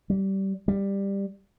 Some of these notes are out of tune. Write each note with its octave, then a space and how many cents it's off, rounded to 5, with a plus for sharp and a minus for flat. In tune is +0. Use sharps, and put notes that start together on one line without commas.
G3 -20
G3 +10